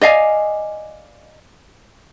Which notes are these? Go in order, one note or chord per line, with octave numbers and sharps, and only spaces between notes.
D5 D#5 F5 G#5